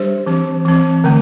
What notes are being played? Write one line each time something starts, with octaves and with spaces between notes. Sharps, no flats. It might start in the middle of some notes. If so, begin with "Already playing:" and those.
Already playing: G3 D4 G4 C5
E3 C4
E3 C4
D3 A3